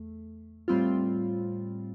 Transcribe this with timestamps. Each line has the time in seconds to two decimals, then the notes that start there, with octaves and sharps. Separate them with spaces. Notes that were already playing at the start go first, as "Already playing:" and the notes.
Already playing: E2 A3
0.68 A2 G3 C4 F4